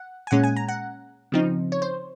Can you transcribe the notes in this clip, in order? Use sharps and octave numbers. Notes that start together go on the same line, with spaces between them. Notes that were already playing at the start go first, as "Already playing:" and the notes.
Already playing: F#5
G#5
A#2 G#3 C#4 F#5
G#5
A#5
F#5
C#3 F3 C4 D#4
C#5
C5